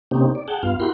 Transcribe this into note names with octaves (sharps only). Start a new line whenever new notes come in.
C3 A#3 C4 C#4 D#4 G4
D5
G#4 F#5 G5 A5
G2 B3 F4 F5
E4 F#4 G4 A#4 B5 C6